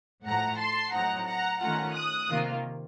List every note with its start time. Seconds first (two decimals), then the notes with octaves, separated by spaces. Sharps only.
0.25 A2 F3 A3 F#5 A#5
0.59 A5 C6
0.92 A2 F#3 C4 D#4 F#5 A#5
1.26 F#5 A#5
1.60 D#3 A3 C#4 F4 F#5 A#5
1.94 D#6 F#6
2.29 C3 D#3 A#3 F4